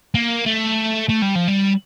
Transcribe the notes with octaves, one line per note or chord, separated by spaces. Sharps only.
A#3
A3
A3
G3
F3
G3